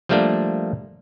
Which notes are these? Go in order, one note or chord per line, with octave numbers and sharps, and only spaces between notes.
F3 G3 A3 A#3 D4